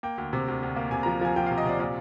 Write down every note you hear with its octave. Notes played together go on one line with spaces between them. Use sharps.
A#3 G5
D2
C3
D2
D2
A#3
C3 G#5
F3 A#5
F3 G#5
F3 G5
C3 F5
D#5
C3 D5
A#2 D5